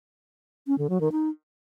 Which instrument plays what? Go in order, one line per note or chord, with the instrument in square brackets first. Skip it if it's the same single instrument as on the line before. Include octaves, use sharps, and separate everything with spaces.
[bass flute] C#4
D3
F#3
D#3
D#4